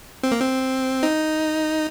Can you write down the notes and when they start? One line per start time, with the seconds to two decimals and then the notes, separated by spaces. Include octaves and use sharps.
0.23 C4
0.32 A#3
0.40 C4
1.03 D#4